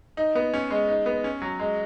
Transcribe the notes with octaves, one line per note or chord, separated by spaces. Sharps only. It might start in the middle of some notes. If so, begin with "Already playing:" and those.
D#4
B3
C#4
G#3
D#4
B3
C#4
F#3
G#3